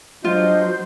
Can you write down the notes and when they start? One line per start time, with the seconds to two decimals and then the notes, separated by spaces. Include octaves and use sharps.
0.24 G2 F#3 D4 F4 C5 D#5